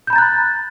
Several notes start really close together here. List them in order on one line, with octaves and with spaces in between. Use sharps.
G6 B5 A#5 A6 F#6